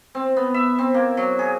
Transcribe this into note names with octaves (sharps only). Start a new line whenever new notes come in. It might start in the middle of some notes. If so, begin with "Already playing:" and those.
C4
B3
E5
C4
A#3
F#3
G#4